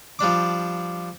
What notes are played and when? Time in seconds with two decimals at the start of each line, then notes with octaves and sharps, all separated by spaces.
0.19 F3 G3 D4 D6